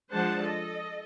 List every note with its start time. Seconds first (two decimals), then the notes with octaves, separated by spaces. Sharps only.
0.13 F3 G#3 D4 C5 F#5 A5
0.42 A4 D#5